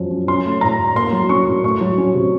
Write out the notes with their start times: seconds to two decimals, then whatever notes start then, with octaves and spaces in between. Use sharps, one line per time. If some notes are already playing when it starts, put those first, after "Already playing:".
Already playing: F#2 F3 C4
0.11 F#2
0.28 C#4 C6
0.46 A3
0.61 A2 A#5
0.78 A2
0.96 A#3 C6
1.12 F#3
1.29 C#4 C#6
1.47 A2
1.64 A3 C#6
1.81 F#3
1.98 C#4
2.14 C3